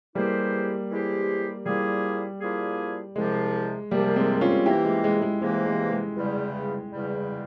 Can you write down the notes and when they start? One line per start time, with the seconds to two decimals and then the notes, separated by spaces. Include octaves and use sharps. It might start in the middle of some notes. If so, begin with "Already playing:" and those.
0.15 E3 G3 G#3 A#3 E4 G4 C5
0.91 E3 G#3 E4 G4 C5
1.66 A#2 F3 G3 A#3 E4 G#4
2.41 A#2 F3 A#3 E4 G#4
3.16 C2 C3 F3 G#3
3.90 C2 C3 F3 G3 A#3
4.16 G#3 C4
4.41 C#4 F4
4.66 C3 E3 A#3 E4 G4
4.85 G#3
5.04 G#3
5.22 G#3
5.41 C3 E3 G#3 A#3
5.66 G#3
5.91 G#3
6.16 E2 C#3 G3
6.92 E2 C#3 G3